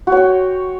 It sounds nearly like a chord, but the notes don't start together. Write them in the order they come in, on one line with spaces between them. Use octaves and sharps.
F#4 C#5 G5